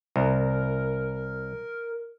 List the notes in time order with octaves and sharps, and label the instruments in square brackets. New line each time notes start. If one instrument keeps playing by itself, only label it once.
[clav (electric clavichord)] C2 [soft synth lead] A#4